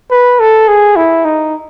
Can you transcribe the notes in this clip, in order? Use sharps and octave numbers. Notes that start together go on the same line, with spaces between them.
B4
A4
G#4
E4
D#4